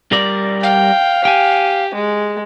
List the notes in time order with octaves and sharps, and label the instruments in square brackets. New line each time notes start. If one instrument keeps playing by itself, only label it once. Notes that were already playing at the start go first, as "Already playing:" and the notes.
[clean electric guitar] G3 A#4 D5
[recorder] F5 [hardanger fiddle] G5
[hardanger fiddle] G4 [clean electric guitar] G5 G#5
[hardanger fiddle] G#3